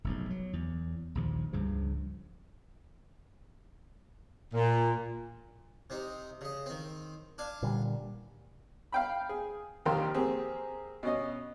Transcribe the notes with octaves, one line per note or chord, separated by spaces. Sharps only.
F1 B1 G#2
F#3
E2
A#1 D#2 C#3 F3
C#2 G2 C#3 F3
A#2
C3 C4 D#4
C#3 D#5
D#3 C4
D4 F5 G#5
A#2 D3 G3
F5 G5 B5
G#4
A#1 D#2 C3 A#4 G5 C6
A#3 C4 G4 G#4
B2 C#4 D#5